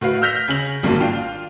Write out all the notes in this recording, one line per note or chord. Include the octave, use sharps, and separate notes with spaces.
A2 F#4 B4 F5
E6 F6 G6 A#6 B6 F7
C#3 C#4 F#7
G#1 G2 A#3 F#4 A5
D4 F4 G5